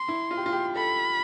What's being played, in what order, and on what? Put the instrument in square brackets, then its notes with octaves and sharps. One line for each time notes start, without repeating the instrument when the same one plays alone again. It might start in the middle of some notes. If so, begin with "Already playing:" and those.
Already playing: [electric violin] C6
[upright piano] E4
F4
G4
F4
G4
[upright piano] A4 [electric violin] B5